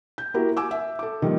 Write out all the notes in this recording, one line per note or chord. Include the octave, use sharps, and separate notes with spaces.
G6
A#3 E4 F#4 G4 A#4
G#5 D6 E6
E5
A4 D6
D#3 F3 G3 A#3